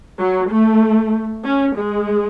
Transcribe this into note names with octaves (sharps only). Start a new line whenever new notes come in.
F#3
A3
C#4
G#3